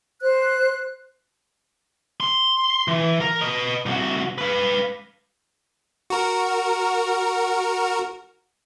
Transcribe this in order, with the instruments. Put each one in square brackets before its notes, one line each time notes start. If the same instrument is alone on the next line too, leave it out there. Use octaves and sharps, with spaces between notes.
[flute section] C5 F#6
[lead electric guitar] C6
E3
A#4
B4 D#5
C2 F#4
B4 F5
[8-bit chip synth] F#4 A#4